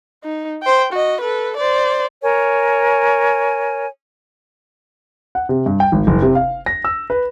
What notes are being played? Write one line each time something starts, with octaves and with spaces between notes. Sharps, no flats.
D#4
C5 G5
F#4 D#5
A4 B4
C5 D5
A#4 C#5 G#5
F#5
C3
G2
G5
G#1
F#1
C3
F5
A#6
E6
B4